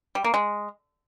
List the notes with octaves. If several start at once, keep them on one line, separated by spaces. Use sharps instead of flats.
G3
A#3
G#3